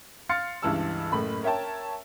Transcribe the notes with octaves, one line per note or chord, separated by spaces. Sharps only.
F5 C6 F6 A6 C#7
C#2 G2 E3 A5 E6
F#1 A2 B5
A#4 C#5 E5 G5 A5